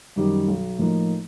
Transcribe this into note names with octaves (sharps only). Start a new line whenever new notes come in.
F#2 D#3 G3
B1
A2 F3 A#3 D#4